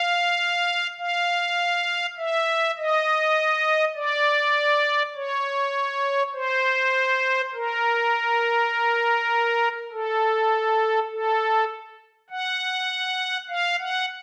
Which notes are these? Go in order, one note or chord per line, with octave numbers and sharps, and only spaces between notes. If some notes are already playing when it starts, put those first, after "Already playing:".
Already playing: F5
F5
E5
D#5
D5
C#5
C5
A#4
A4
A4
F#5
F5
F#5